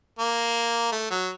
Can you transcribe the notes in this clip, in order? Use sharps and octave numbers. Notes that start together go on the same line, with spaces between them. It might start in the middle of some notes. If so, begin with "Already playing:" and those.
A#3
A3
F#3